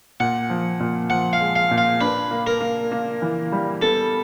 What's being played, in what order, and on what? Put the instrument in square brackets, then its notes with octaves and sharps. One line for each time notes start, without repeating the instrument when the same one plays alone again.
[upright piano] A#2 [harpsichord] F#5
[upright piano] F3
A#2
[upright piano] F3 [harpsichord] F#5
[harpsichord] F5
[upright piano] G#3
[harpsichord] F5
[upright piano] A#2
[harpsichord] F5
[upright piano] D4 [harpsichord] B4
[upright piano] A#3
[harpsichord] A#4
[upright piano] A#3
A#3
E3
G3
[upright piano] B3 [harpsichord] A4